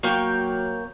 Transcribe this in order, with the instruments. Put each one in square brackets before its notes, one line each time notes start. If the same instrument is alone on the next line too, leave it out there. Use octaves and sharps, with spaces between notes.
[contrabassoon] F#3 [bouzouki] A#3 C#5 G5